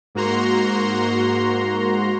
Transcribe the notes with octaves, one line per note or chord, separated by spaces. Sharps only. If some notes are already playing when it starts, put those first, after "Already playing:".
G#2 A#3 F#4 A#5 C6